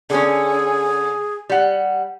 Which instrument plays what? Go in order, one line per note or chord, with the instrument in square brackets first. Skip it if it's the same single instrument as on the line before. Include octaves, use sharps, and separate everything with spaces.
[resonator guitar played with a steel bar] D3 C#4 [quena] G#4
[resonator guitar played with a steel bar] G3 F#5